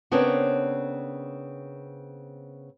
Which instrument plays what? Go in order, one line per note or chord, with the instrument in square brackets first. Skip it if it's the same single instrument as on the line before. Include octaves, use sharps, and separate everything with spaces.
[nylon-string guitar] C#3 B3 C4 D4 A#4 C#5